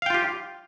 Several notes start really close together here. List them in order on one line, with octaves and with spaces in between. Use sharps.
F5 G5 F4 G4